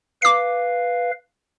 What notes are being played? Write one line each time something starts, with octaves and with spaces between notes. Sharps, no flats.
B4 F5 D6 C7